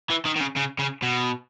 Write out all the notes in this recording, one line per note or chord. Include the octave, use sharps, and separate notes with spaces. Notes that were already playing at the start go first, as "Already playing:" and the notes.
E3
D#3
D#3
C#3
C#3
C#3
B2